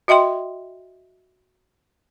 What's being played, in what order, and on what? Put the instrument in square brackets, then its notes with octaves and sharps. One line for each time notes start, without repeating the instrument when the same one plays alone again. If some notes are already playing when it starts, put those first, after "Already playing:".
[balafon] F#4 D#5 E5 G5 C6